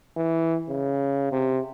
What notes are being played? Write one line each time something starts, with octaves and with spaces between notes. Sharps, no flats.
E3
C#3
C3